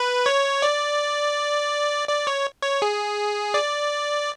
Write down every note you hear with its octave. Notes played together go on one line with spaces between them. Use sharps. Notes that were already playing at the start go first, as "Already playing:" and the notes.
Already playing: B4
C#5
D5
D5
C#5
C#5
G#4
D5